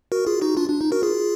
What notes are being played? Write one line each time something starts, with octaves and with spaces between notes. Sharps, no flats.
F#4 A#4
F4 G#4
D#4 F#4
D4 F4
D4
D#4
F#4 A#4
F4 G#4